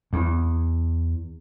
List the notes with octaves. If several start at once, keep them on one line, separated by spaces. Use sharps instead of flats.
E2